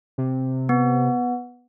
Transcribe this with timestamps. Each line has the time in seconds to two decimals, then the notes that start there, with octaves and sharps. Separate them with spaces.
0.18 C3
0.69 B3